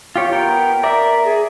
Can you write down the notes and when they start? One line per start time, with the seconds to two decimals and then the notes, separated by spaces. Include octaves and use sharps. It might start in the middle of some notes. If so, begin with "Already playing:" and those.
0.16 F4 G4 C#5
0.32 B3 A#4 G5
0.83 A#4 D5 E5
1.25 G#4